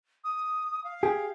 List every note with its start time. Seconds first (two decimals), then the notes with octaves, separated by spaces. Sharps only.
0.24 D#6
0.84 F5
1.03 G4 G#4